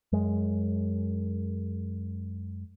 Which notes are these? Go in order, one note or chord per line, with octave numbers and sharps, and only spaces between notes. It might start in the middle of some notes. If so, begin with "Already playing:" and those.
F#2 G#3